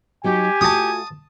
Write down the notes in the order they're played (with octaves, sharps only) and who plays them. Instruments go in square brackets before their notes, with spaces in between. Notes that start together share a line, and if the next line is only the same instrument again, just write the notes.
[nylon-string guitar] F#3 D#4 F#4 [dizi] G4 [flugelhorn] G#5
[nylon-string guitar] A3 F4 F#4 [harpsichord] A5 D#6